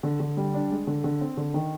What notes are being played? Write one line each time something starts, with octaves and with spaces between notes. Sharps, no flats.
D3
D3
G3
D4
G#3
D3
D3
C4
D3
D#3